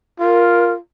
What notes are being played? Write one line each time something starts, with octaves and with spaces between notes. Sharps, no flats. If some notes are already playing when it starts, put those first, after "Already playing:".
F4 A#4